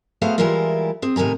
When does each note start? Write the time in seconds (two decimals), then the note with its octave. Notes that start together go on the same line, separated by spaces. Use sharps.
0.22 A3 B3 F#4 G#4 C5 F5
0.38 E3 G3 G#3 E4 F4 A#4
1.02 C4 G#4
1.16 A2 C3 D#3 G#5 A#5